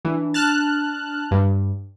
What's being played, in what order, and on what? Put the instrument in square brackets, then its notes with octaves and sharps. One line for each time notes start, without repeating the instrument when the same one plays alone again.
[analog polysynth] E3 [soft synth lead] D4
[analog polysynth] A5 F6 F#6
G2